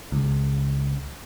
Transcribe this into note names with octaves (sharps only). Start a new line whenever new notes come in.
C#2